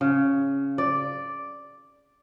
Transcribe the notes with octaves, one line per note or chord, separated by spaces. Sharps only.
C#3
D5